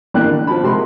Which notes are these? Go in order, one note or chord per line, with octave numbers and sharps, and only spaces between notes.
A1 A#3 D4 G5 F#6
D3
F3 F#4 A5 B5
C3 G#3 F#4 A#4 C6